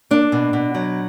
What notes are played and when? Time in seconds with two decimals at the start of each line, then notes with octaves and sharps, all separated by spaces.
0.11 A#3 D4
0.32 B2
0.53 B2
0.75 F#3